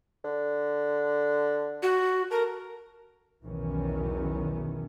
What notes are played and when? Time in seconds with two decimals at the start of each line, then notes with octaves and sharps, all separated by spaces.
0.24 D3
1.83 F#4
2.31 A4 A#4
3.44 B1 E2 D#3 E3 F#3 C#4